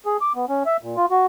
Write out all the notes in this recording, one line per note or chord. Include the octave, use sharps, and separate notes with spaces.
G#4
D6
B3
C#4
E5
A#2
F4
F#4